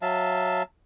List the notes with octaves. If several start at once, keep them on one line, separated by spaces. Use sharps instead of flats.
F#3 E5 F5 A5